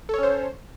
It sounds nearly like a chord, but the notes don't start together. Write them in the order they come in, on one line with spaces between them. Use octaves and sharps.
A4 C#5 C#4 C5